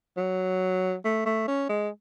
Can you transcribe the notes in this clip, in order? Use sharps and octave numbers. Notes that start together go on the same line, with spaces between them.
F#3
A3
A3
C#4
G#3